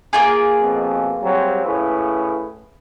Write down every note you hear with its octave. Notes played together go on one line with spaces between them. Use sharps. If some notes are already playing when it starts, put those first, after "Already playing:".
A#3 F4 G#4
F2 B2
F#3 G3 C4
A2 C#3 B4